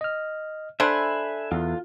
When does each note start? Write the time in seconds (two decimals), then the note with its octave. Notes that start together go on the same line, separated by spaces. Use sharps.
0.01 D#5 F6
0.80 D4 A4 C5 E5 G#5 B5 F#6
1.52 E2 F4